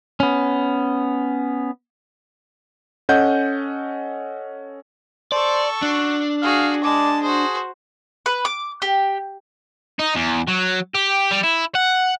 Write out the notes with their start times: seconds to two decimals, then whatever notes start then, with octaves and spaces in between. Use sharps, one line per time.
0.20 B3 C#4
3.09 C#4 A4 D#5 F#5 G6
5.32 A4 C5 D5 C#6
5.82 D4 F#4
6.43 F#4 G#4 F5
6.84 G#3 D5 A5
7.23 F#4 G#4 C5
8.26 B4
8.45 D6
8.82 G4
9.99 D#4
10.15 E2
10.48 F#3
10.94 G4
11.31 G3
11.43 E4
11.75 F#5